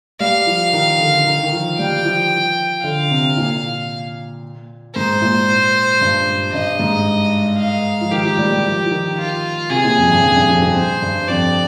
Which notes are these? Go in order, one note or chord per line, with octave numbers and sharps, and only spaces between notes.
G3 F5
F3
D#3
D3
D#3
D#3
F3
G3 G5
F3
D3 F5
C3
A#2
G#2 C5
A#2
G2
G2 D#5
G#2
F5
F3
D#3 G4
F3
G3
G3
F3
F3
D#3
F4
C3 G#4
A#2
F2
G2
F2
G2
F2
F2
C5
G2
F2 D5